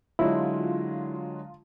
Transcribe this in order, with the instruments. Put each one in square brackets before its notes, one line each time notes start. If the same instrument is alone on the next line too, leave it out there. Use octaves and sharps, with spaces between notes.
[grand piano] D3 F#3 G#3 [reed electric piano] E4 [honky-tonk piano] F4